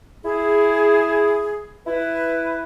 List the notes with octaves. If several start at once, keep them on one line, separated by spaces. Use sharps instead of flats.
E4 G#4
E4 B4